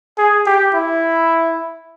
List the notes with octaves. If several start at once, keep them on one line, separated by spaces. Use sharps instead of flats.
G#4
G4
E4